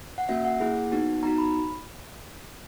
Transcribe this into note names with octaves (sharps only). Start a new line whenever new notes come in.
F#5
A#3 C#4 F#4 E5
F#5
A#3 E4 G#4
B3 D#4 F#4
B3 D#4 F#4 A#5
B5